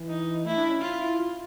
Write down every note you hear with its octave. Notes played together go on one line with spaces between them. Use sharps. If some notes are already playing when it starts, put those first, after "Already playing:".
Already playing: E3
D#4
A3 E4
D4
C#4
F4
E4
F4